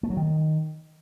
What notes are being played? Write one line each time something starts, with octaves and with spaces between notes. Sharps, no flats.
A3
F#3
D#3